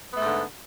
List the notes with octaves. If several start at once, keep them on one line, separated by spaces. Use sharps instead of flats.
G#2 D3 A3 B3